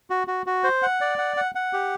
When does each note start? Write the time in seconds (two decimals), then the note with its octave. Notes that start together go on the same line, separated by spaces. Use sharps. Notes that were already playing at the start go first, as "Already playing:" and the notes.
0.10 F#4
0.27 F#4
0.46 F#4
0.64 C5
0.82 F#5
1.01 D5
1.18 F#5
1.37 F#5
1.55 F#5
1.73 G4